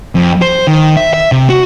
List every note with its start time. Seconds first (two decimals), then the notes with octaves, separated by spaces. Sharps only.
0.15 F2
0.42 C5
0.67 D#3
0.97 E5
1.14 E5
1.32 C3
1.50 F#4